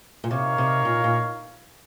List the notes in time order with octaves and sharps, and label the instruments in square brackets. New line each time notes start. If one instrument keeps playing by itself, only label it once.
[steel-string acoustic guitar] A#2
[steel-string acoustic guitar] C3 [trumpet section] D#4 A#4 C#5 F5
[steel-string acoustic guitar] C3
A#2
A#2